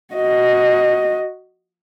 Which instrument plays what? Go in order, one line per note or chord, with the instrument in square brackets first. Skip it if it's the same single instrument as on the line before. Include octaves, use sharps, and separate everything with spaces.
[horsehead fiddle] F#4 D#5